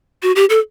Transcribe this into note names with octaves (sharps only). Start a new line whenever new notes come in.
F#4
G4
A4